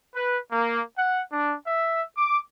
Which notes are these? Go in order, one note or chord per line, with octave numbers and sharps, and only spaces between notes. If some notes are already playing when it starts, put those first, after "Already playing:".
B4
A#3
F#5
D4
E5
D6